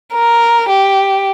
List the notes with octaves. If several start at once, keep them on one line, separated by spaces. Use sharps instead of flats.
A#4
G4